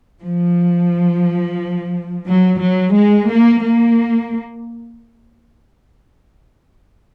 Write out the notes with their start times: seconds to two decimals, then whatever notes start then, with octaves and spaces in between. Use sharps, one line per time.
0.21 F3
2.26 F#3
2.61 F#3
2.94 G#3
3.29 A#3
3.63 A#3